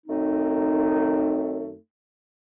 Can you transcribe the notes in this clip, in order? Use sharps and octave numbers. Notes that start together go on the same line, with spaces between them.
F#2 D#3 A3 C4 D#4